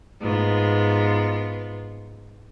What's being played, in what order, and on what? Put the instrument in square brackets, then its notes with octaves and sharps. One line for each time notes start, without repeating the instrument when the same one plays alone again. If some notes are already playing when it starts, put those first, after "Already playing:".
[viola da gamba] G#2 B3 F4